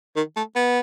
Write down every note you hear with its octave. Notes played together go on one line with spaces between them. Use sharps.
D#3
A3
B3